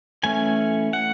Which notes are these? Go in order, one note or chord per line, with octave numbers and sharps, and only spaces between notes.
E3 A3 C#4 G#5
F#5